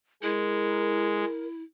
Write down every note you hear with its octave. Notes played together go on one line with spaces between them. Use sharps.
G#3 E4 A#4